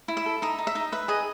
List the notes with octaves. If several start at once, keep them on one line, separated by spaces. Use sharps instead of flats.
E4
E5
A4
D#4 E5
D#4
E5
D#4
B4 E5
G#4 D#5